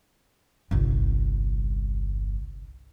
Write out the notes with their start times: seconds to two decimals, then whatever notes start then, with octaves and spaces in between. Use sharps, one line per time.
0.71 G1 C2